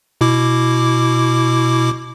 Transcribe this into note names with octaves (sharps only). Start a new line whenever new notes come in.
B2 E4 D6